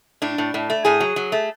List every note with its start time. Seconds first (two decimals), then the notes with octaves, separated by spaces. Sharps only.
0.22 A2 D4
0.38 A2
0.54 A2
0.70 A3
0.85 A2 G#4
1.00 F#3
1.16 F#3
1.32 A3